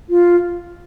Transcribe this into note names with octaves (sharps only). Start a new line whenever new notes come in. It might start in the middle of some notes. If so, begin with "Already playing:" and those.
F4